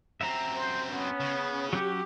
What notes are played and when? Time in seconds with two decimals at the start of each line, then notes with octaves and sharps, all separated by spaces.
0.21 F#2 C4 E5 A#5
0.55 C5
0.90 B3 C#4
1.20 C#3
1.73 F#3 C#4 F#4 G4